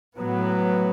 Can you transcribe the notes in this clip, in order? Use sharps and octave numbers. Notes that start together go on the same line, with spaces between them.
A2 F#3 B3